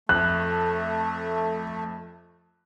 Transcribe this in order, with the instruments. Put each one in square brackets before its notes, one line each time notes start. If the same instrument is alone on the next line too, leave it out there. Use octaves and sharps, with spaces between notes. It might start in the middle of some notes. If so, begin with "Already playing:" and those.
[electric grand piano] F2 [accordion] A3 [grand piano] F#6